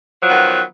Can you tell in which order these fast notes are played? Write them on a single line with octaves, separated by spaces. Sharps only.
F3 F#3 B3 D#3